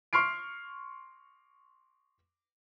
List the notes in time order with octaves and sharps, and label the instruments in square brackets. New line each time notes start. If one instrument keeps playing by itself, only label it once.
[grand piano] C6 C#6 F6 C7 D7